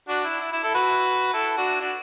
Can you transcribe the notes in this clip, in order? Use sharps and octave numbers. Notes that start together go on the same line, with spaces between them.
D4 F#4
E4
E4
E4
E4 A4
F#4 B4
E4 A4
D4 F#4
D4 F#4